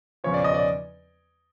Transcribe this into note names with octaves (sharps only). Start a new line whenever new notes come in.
E2 C#3 F3 C#5
D5
D#5
D5